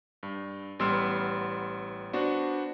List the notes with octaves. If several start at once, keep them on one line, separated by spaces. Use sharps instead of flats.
G2
A1 G3 B3 C6 E6 F6
B3 D4 F#4 C5